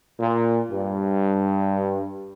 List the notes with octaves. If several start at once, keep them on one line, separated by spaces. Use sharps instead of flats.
A#2
G2